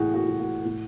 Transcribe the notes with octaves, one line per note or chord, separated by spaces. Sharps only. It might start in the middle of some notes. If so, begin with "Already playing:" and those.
Already playing: A2 E3 F#4 G#4
F#4
E3
F#4
A2